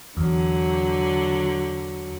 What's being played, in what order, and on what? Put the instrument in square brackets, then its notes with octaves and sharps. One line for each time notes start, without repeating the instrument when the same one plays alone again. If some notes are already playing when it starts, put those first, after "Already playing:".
[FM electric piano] E2 [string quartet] D3 F#3